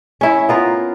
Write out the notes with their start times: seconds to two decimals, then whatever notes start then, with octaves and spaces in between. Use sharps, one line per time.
0.21 C#4 E4
0.49 B3 F4 A#4